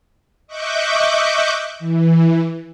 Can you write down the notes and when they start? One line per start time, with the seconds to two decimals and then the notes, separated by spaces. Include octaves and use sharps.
0.47 D#5 E5 C#6 D6 F#6 G6
1.79 E3